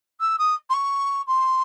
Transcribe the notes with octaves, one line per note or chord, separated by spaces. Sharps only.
E6
D#6
C6
C#6
C6